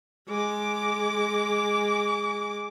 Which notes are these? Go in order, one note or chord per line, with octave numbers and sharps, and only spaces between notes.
G#3 D6